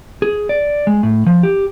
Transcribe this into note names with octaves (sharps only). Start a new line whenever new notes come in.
G#4
D5
G#3
A2
F3
G4